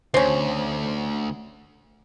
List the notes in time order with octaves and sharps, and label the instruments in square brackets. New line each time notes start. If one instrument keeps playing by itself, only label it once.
[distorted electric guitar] D2 [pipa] C4 C#4